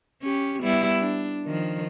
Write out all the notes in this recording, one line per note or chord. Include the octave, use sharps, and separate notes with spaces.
C#4 G4
G3 B3 E4
D4
D#3 F3